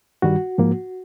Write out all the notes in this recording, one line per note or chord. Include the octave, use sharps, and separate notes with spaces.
G2 D#3 G3 F#4
G#2 F3 A#3